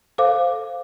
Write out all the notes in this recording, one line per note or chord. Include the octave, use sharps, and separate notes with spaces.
A4 C5 F5 D6